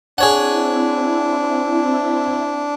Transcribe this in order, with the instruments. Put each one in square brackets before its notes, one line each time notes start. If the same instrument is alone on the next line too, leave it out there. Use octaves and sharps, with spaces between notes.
[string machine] C4 E4 [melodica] D4 [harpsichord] G#4 C#5 F#5